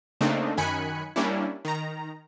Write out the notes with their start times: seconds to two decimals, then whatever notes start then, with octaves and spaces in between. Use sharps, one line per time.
0.21 C#3 A3 A#3 C4 D4 D#4
0.57 F#2 D#3 G#5 B5 F#6 C#7
1.16 G3 A#3 C#4 D4 E4
1.65 D#3 A#5